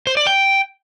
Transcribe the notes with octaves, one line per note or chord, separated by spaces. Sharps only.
C5
D5
G5